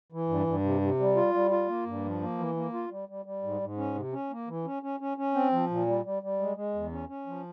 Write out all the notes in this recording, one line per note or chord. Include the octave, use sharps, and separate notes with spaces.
E3
G2
G2
C3
C3
G3
F4
G3
F4
A#3
G2
F3
A#3
E3
A#3
F4
G3
G3
G3
G#2
G#2
C#4
C3
C#4
A#3
E3
C#4
C#4
C#4
C#4
C4
F3
A#2
G3
G3
G3
G#3
G#3
E2
C#4
C#4
F3